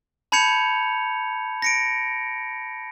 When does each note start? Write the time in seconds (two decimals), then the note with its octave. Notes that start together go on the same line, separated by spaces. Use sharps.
0.32 A5 B5 G6 G#6 C#7 F7
1.62 A#6 C#7 D7